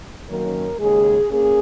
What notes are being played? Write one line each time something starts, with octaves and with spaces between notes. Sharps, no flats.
F#2 D#3 F#3 A#3 C#4 A#4
D#2 C#3 G#3 G#4
A#3 C#4 G#4